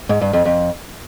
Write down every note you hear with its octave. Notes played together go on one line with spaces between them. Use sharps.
G#2
G2
F2
F2